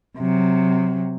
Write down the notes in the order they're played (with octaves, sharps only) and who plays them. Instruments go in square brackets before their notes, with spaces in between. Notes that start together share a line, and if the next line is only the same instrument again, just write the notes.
[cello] C3 F#3